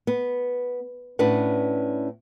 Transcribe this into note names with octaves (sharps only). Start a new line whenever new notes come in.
B3
A2 C#4 D4 B4 F#5